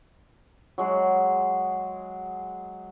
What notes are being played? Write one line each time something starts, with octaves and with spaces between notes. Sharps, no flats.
F#3 G#3 G#4